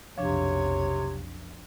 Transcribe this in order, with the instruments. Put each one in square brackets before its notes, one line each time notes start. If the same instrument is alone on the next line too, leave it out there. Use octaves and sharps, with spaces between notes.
[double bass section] B1 F2 [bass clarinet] C3 [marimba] F3 D4 [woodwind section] C#5